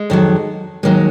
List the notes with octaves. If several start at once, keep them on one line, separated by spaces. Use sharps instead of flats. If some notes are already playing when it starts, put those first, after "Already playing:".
Already playing: G#3
F2 D#3 F#3
D#2 D#3 F#3 G#3